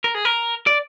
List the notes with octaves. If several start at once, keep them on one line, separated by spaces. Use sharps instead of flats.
A#4
G#4
A#4
D5